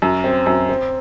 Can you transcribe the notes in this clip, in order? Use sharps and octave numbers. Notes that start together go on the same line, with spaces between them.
F#2
C4
F#2
C4